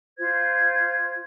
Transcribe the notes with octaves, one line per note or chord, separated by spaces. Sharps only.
F4 C5 G#6